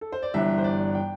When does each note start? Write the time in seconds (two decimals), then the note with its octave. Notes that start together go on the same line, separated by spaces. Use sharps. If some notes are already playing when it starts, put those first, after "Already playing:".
0.01 A4
0.12 C5
0.22 D5
0.34 G1 G2 E3 E5
0.58 C5
0.64 D5
0.95 G5